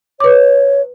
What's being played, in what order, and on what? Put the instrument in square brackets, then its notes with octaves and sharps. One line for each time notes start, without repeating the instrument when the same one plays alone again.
[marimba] B4 D6 [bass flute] C#5